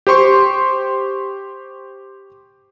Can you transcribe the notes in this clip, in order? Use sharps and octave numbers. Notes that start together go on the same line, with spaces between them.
G4 C5 C6 C#6